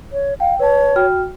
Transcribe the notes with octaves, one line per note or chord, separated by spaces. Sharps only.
C#5
F5 G5
B4 C#5 A5
F#4 G5 F6